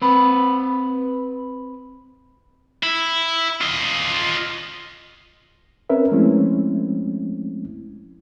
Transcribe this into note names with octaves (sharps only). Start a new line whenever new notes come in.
C4 B4
E4
F4 D#5
C4 C#4 A#4 B4 E5
F3 G#3 A3 C4 C#4 E4